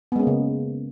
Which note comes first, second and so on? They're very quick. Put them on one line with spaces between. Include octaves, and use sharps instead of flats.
B3 G#3 C#4 A#3 C#3